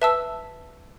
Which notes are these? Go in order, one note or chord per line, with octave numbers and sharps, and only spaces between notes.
B4 E5 A5 E6